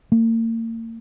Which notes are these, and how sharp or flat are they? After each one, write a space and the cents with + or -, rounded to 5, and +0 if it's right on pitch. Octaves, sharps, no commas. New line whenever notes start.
A#3 -40